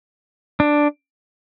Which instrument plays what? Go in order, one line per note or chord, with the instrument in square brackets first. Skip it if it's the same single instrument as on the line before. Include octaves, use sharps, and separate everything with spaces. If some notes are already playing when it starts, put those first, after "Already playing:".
[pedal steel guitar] D4